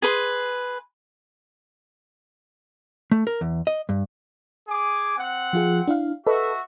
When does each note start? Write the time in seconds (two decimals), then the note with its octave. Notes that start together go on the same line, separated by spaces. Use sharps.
0.02 G#4 B4 C6
3.12 A3
3.27 A#4
3.41 E2
3.67 D#5
3.89 G2
4.68 G#4 G#5 D6
5.17 C4 F#5
5.53 F3 F4 G#4
5.88 D4 E4 F5
6.27 F#4 A4 B4 D#5 E5